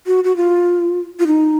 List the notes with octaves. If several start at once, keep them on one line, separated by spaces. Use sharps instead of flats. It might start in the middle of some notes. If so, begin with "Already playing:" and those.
F#4
F#4
F4
F4
D#4